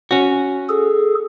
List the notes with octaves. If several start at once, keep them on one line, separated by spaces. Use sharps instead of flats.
C#4 F#4
G#4 A4